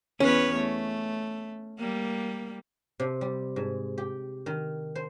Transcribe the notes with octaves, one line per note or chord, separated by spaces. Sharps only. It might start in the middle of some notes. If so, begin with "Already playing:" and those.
E2 C#4 B4 C#5
A3
G3 A#3
C3
G3
G#2
G4
D#3
C5